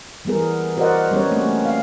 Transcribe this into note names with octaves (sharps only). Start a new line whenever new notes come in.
E3 G3 B3 G#4 A#4
F#4 A#4 C5 D5 D#5 F#5
G3 B3 C#4 C#5
A3 A#3 C4 C#4
F5